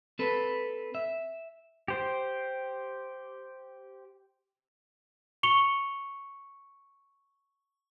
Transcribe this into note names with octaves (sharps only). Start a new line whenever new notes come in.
C4 A4 B4
E5
G4 C5
C#6 C#7 F7 G7